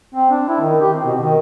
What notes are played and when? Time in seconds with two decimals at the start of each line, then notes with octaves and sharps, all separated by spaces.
0.14 C4
0.30 D4
0.48 E4
0.61 D#3
0.81 G4
0.94 C4
1.06 B2
1.21 D#3